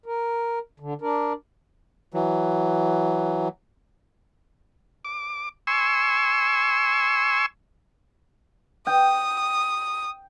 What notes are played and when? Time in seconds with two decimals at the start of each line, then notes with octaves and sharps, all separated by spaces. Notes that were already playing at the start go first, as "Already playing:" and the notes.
0.06 A#4
0.80 D3
1.01 D4 A#4
2.14 E3 F#3
5.05 D6
5.67 G#5 C6 C#6 E6
8.87 G5 D#6